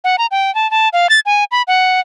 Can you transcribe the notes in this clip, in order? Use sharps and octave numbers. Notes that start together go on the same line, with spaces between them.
F#5
A#5
G5
A5
A5
F5
A6
G#5
B5
F#5